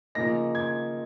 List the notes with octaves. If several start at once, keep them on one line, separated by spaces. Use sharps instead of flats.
C#3 F3 A#3 D#4 A#6
G#6